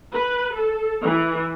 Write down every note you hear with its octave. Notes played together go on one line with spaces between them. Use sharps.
B4
A4
E3